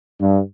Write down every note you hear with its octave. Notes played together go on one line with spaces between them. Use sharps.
G2